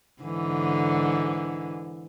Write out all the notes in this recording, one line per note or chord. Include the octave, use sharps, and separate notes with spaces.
G#2 D3 E3